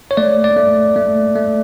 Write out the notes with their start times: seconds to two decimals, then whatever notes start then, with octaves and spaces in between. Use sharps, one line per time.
0.11 C#5
0.17 A3 D5
0.44 D5
0.57 A3
0.96 A3
1.36 A3